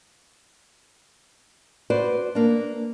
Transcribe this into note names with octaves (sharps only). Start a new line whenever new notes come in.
F#4 B4 C5 D5
A#3 D4